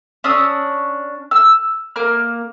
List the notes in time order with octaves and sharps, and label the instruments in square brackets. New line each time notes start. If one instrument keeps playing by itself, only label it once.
[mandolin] C#4 D4 D#6 E6
E6 F6
A#3 A#5 F6